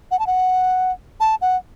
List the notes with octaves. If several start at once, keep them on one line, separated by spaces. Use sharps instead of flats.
F#5
A5
F#5
A5
F#5